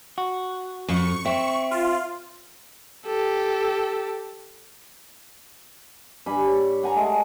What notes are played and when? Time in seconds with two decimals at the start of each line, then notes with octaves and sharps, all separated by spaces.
0.18 F#4
0.88 F2 C#6
1.25 C4 E5
1.71 F4
3.06 G4 A4
6.26 G2 G#5 B5
6.48 C#5
6.83 F#5 G#5 A#5
6.96 G#3 A3